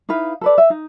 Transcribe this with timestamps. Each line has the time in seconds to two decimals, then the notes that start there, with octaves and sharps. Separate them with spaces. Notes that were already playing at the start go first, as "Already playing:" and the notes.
0.09 D#4 E4 B4 F5
0.41 A4 B4 D5
0.58 E5
0.70 D#4